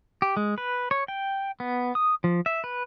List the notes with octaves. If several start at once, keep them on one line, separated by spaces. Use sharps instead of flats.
G4
G#3
B4
C#5
G5
B3
D#6
F3
E5
B4